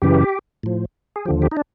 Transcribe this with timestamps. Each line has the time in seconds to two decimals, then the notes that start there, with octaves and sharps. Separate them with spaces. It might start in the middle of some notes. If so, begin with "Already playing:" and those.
0.02 F#2 C#3 E3 G4
0.63 A2 F3
1.16 G#4
1.25 F3 G4
1.28 D#2 D3
1.42 G4
1.51 D#4
1.57 D4